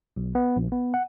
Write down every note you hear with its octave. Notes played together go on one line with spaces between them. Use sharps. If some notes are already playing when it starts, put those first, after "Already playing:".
B1
B3
A#1
B3
F#5